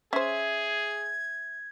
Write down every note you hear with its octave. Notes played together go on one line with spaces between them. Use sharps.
C#4 G#4 C5 E5 G#6